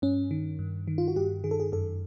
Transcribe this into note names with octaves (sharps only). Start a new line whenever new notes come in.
G2 C#4
D#3
G2
D#3
F4
F#4
G2 G4
D#3 G#4
A4
G#4
F#2 A4